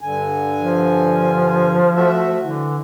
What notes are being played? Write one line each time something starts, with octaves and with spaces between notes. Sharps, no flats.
G2 D3 G#5
F3
A3 F#4 E5
D3 E3